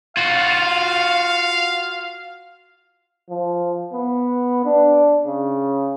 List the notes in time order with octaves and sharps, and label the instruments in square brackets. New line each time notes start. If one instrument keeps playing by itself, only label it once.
[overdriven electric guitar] F4 F#4 [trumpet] F5
[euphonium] F3
B3
D4
C#3